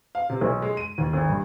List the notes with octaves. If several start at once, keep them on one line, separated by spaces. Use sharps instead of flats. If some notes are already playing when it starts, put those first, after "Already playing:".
F5
C3
B1
G#3
D#7
D#2
G#1
G2